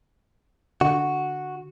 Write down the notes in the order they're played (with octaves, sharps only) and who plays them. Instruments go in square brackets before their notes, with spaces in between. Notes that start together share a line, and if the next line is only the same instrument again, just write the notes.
[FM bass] D3 [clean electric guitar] F#4